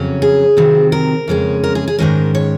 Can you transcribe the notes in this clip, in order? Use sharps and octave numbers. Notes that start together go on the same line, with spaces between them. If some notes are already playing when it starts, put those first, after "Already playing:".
Already playing: F2 C#3 F#3 C#4
G#4
C3 D#3 F#3 C4
A#4
F2 C#3 G#3 C#4
A#4
G#4
G#4
G#2 D#3 G#3 C#4 A#4
C#5